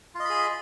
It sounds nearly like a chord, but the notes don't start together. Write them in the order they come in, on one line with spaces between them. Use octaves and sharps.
F4 D#5 B5 G#4